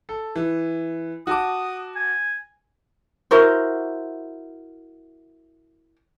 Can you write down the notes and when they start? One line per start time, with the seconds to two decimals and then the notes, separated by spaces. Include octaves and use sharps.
0.09 A4
0.35 E3
1.27 F#4 A5 D6 D#6
1.96 G#5
3.31 E4 F#4 A#4 C5